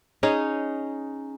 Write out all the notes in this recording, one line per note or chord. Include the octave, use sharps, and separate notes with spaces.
C#4 D#4 G#4